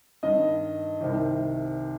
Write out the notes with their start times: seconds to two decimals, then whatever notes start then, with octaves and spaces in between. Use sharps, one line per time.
0.23 G2 D#3 D#5
1.01 C2 C3 D#3